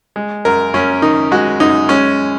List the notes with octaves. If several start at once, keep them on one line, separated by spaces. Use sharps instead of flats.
G#3
F#2 A#4
F#2 C#4
D#3 D#4
G#3 F#4
F#2 D#4
G#3 C#4